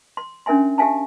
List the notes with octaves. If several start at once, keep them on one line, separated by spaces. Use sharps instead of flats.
C6
C#4 D4 A#4 E5 G#5 C6
G4 E5 F5 G#5 A5